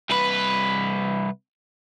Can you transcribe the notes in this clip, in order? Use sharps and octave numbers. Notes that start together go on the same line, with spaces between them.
C2 B4